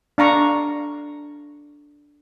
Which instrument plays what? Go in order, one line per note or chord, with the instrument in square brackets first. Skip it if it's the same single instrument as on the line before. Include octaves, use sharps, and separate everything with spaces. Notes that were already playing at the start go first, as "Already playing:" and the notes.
[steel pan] D4 F5 A#5 C#6